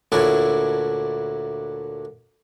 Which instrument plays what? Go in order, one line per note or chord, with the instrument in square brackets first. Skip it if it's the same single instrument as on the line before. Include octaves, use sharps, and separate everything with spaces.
[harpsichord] D2 A#2 D4 E4 C#5